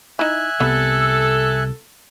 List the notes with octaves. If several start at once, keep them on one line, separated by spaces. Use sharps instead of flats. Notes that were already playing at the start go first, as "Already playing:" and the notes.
D#4 E4 E5 G#5 F#6
C2 B3 A4